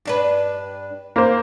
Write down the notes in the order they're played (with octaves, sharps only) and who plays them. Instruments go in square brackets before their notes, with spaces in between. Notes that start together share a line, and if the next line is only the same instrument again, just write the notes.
[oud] G2 D4 B4
[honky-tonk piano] A#3 C5